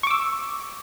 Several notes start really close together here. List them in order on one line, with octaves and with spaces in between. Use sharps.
C#6 D6 E6